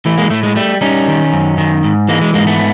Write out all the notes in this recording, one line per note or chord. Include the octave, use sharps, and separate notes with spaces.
E3 A3
G#3 A#3
A2 A3
G#3
G3 A3
G3 C#4 D#4
D#3
F#2
D#3
G#2
E3 G#3 A#3
G#3
G#2 G#3 A#3
A3 B3